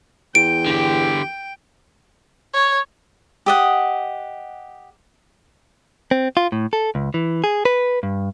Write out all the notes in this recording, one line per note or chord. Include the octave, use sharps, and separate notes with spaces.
E2 G5 D7
D3 G4
C#5
G4 D#5 F#5
C4
F4
A2
A4
C#2
E3
G#4
B4
G2